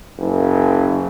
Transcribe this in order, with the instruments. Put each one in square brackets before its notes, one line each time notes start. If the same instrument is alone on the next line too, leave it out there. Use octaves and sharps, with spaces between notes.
[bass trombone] F#1